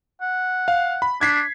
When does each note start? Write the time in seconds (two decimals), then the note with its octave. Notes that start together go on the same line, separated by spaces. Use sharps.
0.22 F#5
0.68 F5
1.02 B5
1.21 D4 G#6 B6 C7